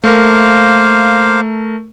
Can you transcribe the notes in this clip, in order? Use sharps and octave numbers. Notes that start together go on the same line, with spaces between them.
A3 A#3 A#4 C5 F5